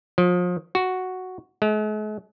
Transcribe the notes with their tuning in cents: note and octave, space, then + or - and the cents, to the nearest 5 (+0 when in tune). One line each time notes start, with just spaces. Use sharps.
F3 +35
F#4 +0
G#3 +45